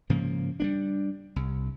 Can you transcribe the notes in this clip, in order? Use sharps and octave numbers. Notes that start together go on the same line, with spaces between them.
G#2 C#3 F3 A#3
G3 A#3 D4
C2